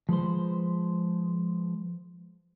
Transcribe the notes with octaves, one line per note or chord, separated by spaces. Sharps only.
F3 G#3 B4 C5